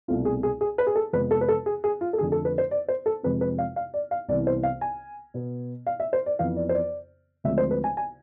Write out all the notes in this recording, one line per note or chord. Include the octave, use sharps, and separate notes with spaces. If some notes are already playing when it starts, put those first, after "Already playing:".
C2 B2 A3 C4 F4
G#4
G#4
G#4
B4
G#4
A4
F2 C3 F3 G#3 B3 B4
A4
B4
A4
G#4
G#4
F4
A4
F2 D3 A3 G#4
A4
B4
C5
D5
C5
A4
F2 C3 G#3 C4 B4
B4
F5
F5
D5
F5
C2 C3 E3 B3 D5
C5
F5
G#5
B2 B3
F5
E5
C5
D5
F2 E3 B3 F5
D5
C5
D5
D2 D3 F3 G#3 C4 E5
C5
B4
G#5
G#5